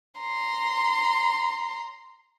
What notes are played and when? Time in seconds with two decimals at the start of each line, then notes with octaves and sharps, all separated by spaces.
0.21 A#5 C6